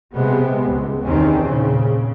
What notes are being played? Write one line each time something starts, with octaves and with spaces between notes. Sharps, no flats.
C3 G#3 B3
C#2
E2 C3 D#3 C4 C#4
A#2 C#3